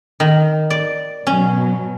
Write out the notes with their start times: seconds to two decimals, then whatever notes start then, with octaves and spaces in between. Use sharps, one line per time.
0.20 D#3
0.70 D5
1.27 B2 F#3 C#4